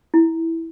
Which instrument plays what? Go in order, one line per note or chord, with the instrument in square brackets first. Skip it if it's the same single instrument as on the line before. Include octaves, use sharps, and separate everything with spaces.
[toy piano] E4